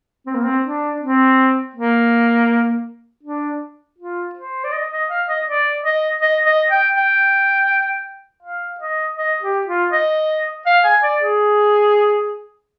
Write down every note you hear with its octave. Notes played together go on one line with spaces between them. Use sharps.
C4
A#3
C4
D4
C4
A#3
D4
F4
C5
D5
D#5
D#5
F5
D#5
D5
D#5
D#5
D#5
G5
G5
F5
D#5
D#5
G4
F4
D#5
F5
G#5
D5
G#4